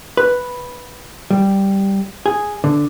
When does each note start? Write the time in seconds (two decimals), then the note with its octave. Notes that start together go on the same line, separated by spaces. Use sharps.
0.17 B4
1.31 G3
2.26 G#4
2.64 D3